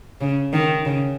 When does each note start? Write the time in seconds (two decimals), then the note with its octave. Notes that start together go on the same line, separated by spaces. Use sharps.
0.21 C#3
0.53 D#3
0.85 C#3